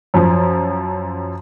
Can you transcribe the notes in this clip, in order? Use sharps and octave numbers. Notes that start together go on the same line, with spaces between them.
F#2 F3